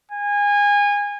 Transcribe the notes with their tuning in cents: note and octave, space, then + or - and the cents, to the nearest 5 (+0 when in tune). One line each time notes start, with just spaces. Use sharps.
G#5 -25